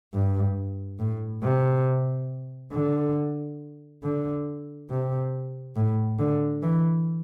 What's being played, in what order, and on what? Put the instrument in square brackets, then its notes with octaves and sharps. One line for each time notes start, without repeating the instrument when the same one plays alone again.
[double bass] G2
A2
C3
D3
D3
C3
A2
D3
E3